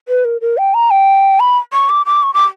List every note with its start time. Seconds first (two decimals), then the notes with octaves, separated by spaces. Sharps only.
0.09 B4
0.25 A#4
0.41 A#4
0.58 G5
0.74 A#5
0.91 G5
1.40 B5
1.73 C#6
1.90 D6
2.06 D6
2.23 C#6
2.34 D6